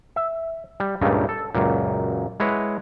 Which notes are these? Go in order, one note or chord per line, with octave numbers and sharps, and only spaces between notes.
E5
G3
C#2 G2 A#2 C#3 A3
A4
C#2 F#2 A#2
G#3 E4 B4 C#5 F#5